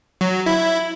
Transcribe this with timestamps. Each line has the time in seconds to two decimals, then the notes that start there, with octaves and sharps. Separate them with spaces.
0.21 F#3
0.46 E4